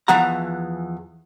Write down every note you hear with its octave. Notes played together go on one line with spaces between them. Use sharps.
E2 E3 F3 F#5 A#5